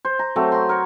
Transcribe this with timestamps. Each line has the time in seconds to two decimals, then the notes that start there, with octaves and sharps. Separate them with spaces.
0.05 C5
0.19 A#5
0.36 F#3 A3 C4
0.52 A#5 C6
0.69 A#4 C#5